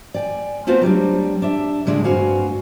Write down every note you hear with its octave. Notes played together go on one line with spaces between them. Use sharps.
D5 G5 G#5
A3 B3 C4 F4 F#4
F#3 G3 C4 D4
D4 E5
A2 D3 G#3 D4 E4 F4
G2 C4 F#4 F5 G#5